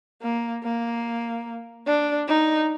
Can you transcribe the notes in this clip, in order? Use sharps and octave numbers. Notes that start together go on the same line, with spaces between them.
A#3
A#3
D4
D#4